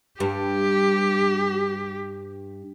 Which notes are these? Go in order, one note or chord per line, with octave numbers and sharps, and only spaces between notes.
G2 G4